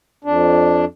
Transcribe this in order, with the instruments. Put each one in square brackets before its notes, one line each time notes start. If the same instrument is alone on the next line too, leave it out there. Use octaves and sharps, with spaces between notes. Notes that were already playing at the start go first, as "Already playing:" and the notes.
[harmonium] F2 D4